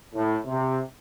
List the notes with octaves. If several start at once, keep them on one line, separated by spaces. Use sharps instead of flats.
A2
C3